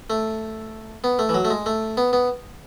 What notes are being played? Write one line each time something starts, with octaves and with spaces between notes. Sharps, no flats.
A3
B3
A3
E3
F#3
A3
G#3
A3
B3
B3